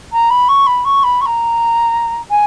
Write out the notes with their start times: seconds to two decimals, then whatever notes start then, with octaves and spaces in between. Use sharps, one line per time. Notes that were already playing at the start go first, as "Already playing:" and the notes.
0.12 A#5
0.30 B5
0.48 C#6
0.66 B5
0.84 C#6
1.03 B5
1.21 C#6
1.25 A#5
2.30 G#5